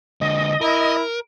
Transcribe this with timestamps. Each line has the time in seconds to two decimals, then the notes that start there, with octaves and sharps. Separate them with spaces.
0.21 D3 G#3 D#5
0.61 E4 A#4